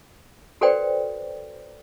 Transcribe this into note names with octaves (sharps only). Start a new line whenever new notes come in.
F#4 A4 B4 C5 D5 G5